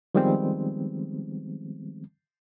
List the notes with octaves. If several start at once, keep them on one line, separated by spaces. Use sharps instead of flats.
D#3 F3 G3 G#3 B3 C4